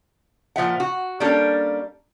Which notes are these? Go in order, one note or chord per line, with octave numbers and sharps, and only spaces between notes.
A#2 F3 E5 F#5
F#4
G3 A#3 C#4 D4 A4